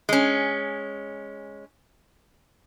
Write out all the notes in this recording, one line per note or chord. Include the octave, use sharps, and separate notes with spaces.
G#3 C#4